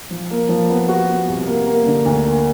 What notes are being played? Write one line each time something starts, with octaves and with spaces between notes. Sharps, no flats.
F3
A#3
F3
B3
F#4
B3
C2
A#3
A#3
D3
D2
A#3